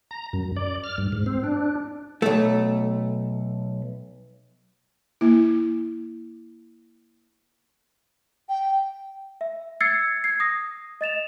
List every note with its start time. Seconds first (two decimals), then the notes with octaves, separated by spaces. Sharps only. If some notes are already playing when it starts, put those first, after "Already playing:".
0.11 A#5
0.33 F#2
0.56 D5
0.84 F6
0.98 G2
1.12 G#2
1.26 C4
1.44 D4
2.22 B1 A3
5.21 A#3 E4
8.49 G5
9.41 E5
9.81 E6 G#6 A6 C7 C#7
10.24 G#6 C7
10.40 D#6 A#6
11.01 D#5 A6 E7 F7